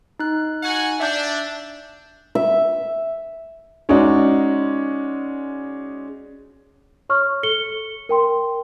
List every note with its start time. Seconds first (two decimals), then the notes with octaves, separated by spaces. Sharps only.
0.20 D#4 F#6
0.63 F#4 F#5 G#5
1.00 D4 E5 G6
2.35 E5
3.89 G#3 C#4 D#4 F#4 D5
7.09 C#5 C#6 F6
7.43 A4 C#7 G7
8.09 A#4 G5 C6